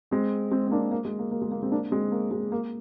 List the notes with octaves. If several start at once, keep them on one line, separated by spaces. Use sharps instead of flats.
G#3 C4
G#3 C4
C4
A#3 D4
A#3
G#3
A#3
A#3
G#3
A#3
G#3 C4
A#3 D4
G#3 C4
A#3
G#3
A#3